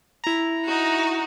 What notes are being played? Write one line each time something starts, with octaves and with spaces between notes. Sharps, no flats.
E4 A#5
D#4 F#4